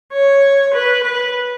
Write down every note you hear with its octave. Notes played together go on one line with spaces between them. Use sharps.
C#5
B4
B4